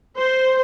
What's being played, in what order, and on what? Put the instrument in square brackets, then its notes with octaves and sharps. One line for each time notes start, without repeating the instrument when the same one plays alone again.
[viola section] C5